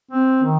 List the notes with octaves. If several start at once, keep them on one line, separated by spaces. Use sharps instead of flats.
C4
D#3